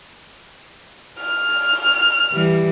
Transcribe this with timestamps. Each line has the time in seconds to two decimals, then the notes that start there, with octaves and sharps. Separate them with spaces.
1.20 F6
2.32 E3 G3